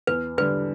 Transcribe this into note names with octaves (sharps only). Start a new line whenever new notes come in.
E2 B4
D3 G3 B4